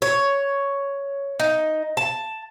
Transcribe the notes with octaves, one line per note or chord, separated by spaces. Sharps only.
C#5
D#4
A5